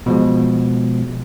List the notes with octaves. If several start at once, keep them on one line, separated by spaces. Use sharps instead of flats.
B2 F3 G#3